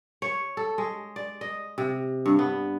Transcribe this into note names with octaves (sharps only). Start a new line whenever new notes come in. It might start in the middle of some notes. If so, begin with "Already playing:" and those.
C#5
A4
G#3
D5
D#5
C3
G2
B3